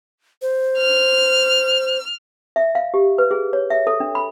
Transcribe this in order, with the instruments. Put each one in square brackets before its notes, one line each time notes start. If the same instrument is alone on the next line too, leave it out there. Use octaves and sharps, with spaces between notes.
[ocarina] C5
[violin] F6
[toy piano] E5
F5
G4
B4
G#4
C#5
E5
A4
D4
B5